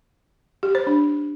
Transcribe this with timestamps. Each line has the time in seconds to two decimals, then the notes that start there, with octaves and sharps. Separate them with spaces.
0.63 G4
0.75 C5
0.87 D4